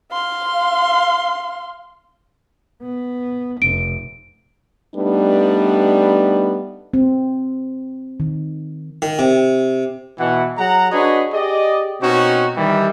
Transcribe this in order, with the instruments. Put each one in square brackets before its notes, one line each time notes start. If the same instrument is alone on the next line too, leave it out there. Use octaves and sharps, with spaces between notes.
[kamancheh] F5 C6
[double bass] B3
[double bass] F1 [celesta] D7
[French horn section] G3 A3 B3 D4 D#4 B4
[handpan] C4
D#3
[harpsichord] D#3
C3
[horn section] B2 E3 F#5
F#3 G#4 F#5 A#5
D4 F#4 G#4 B4 C#5 D#5
G4 G#4 D5 D#5
B2 C4 C#4 D#4 F#4
D#3 E3 G3